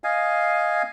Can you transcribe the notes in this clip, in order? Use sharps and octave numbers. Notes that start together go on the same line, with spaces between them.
D#5 F5 G#5